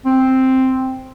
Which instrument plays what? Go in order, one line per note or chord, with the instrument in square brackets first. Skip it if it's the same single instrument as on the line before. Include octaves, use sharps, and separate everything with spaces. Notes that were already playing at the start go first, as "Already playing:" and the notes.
[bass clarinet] C4